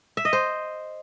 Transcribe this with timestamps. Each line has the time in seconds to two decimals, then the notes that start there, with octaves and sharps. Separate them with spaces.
0.17 E5
0.25 D#5
0.33 C5